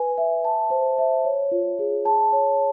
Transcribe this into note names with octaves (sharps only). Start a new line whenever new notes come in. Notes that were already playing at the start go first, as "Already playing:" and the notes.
Already playing: B4 G#5
E5
A5
C5
E5
C#5
F4
G#4
A5
C#5